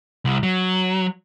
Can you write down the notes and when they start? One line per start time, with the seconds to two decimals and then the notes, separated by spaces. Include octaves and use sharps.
0.25 C2
0.43 F#3